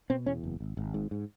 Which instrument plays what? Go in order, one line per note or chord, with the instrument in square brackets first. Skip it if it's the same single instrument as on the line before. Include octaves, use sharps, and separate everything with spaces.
[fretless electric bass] B2 C4
E2 C#4
F#1
G#1
G#1
G#2
G#2